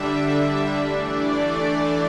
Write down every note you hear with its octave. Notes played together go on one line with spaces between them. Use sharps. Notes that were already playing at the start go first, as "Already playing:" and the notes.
Already playing: D3 G3 D4 E5
E3 A3 D4 D5